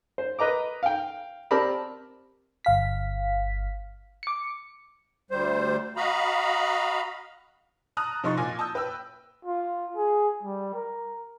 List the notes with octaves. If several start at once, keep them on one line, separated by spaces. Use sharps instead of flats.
C5
A#4 B4 D#5 A#5 D6
F5 G5
C4 G4 A#4 D5 A5 B5
G1 F5 B6
D6 C#7
D2 G3 C5
F#4 D#5 F5 A#5 B5
A5 A#5 D#6 F6 F#6
C3 F3 D#4 C6 C#6 A6
A#2 F4 G#5 D6 A#6
A5 D#6 E6 G6
B4 G5 E6
F4
G#4
G3
A#4